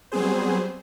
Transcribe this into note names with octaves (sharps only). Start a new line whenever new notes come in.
F#3 G3 B3 C4 G#4 C5